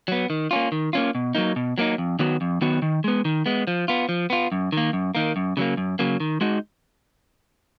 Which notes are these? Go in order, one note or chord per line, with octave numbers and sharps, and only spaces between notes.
F#3 B3
D#3
A#3 C#4 F4
D#3
A#3 C#4 F4
B2
F#3 A#3 D#4
B2
F#3 A#3 D#4
F2
D#3 F#3 B3 F#4
F2
D#3 F#3 B3 F#4
D#3
G#3 B3
D#3
G#3 B3
F3
B3 F4
F3
B3 F4
F#2
D#3 A#3
F#2
D#3 A#3
F#2
C#3 F#3 A#3
F#2
C#3 F#3 A#3
D#3
G#3 D#4 F#4